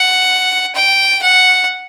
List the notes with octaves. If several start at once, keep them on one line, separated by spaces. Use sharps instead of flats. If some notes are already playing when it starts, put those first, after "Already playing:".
Already playing: F#5
G5
F#5